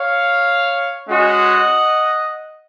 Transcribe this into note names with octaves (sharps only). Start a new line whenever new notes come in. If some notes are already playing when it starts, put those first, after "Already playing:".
Already playing: C#5 F5
G#3 C#4 F#4 D#5 F#5